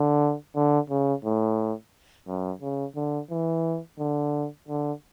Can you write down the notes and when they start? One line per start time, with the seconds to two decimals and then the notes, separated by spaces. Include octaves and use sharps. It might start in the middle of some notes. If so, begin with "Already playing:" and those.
Already playing: D3
0.56 D3
0.90 C#3
1.25 A2
2.28 F#2
2.61 C#3
2.96 D3
3.31 E3
3.99 D3
4.68 D3